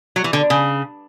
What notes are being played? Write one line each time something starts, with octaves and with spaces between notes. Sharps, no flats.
F#3
E3
D3
C#3